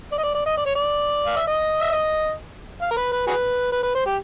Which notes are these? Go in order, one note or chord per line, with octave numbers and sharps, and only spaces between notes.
D5
D#5
D5
D5
D#5
D5
C#5
D5
F5
E5
D#5
E5
D#5
F5
A#4
B4
B4
F#4 G#4 B4
B4
B4
C5
G4